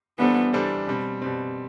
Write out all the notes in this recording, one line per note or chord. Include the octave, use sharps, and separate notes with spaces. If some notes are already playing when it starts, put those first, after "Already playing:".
E3 G3 B3 D4 A4 C5
E3 G3 D4 A4 C5
B2 G3 C4
B2 G3 C4